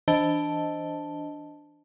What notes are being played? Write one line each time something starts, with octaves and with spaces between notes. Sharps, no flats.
E3 D4 C5 D#5 A5 G7